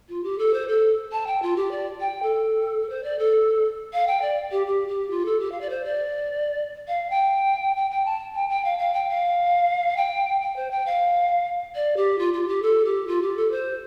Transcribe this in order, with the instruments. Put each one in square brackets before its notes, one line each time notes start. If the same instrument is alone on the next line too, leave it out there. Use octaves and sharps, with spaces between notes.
[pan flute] F4
G4
A4
C5
A4
A5
G5
F4
G4
D5
G5
A4
C5
D5
A4
F5
G5
D5
G4
G4
G4
F4
A4
G4
F5
D5
C5
D5
F5
G5
G5
G5
A5
G5
G5
F5
F5
G5
F5
G5
G5
C5
G5
F5
D5
G4
F4
F4
G4
A4
G4
F4
G4
A4
C5